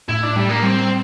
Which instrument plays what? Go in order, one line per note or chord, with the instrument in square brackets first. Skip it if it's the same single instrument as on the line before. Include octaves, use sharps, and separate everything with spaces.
[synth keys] A2 [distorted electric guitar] E4
[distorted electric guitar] D4
[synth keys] A2 [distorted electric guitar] G3
[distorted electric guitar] A#3
[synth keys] G3 [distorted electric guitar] C4